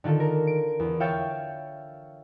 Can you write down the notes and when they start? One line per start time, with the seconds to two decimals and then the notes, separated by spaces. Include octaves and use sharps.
0.04 D3 D#3 F4 A4
0.20 A#4
0.47 D7
0.80 E2
1.00 C#5 E5 F5 G5 C#6 A6